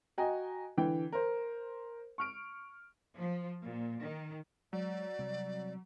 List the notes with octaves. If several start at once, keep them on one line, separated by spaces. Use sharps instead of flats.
F#4 D#5 G5 G#5 A#5
D3 E3 G5
A#4 C5
C#6 F6 D7
F3
A#2
D#3
F#3 G#3 D5
C3 G3 C4